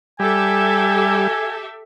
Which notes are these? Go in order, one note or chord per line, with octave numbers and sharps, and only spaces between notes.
G3 G4 A4 E5 G#5